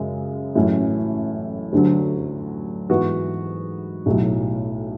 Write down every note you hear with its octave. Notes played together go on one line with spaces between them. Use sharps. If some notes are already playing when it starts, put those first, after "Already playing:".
Already playing: F#2 C#3 G#3
A1 A2 F#3 C#4
D2 D3 F#3
G#2 E3 B3 F#4
B1 A2 F#3